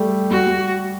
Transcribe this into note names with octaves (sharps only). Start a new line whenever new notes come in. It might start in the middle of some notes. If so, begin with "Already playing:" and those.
Already playing: G3 A3
G3 F#4
G3